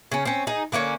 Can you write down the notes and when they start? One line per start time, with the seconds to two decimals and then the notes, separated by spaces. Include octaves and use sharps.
0.12 C#3 C#4
0.25 C4 C#4
0.47 D#4 G#4
0.72 D3 A#3 B3 C#4